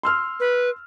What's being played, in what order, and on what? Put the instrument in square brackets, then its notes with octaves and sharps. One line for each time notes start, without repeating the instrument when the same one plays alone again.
[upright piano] C6 E6 F6
[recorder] B4